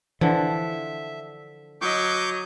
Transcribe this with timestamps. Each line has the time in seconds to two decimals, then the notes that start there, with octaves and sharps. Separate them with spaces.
0.21 D3 E3 F3 E5
1.81 F#3 D#5 C#6 D6 G6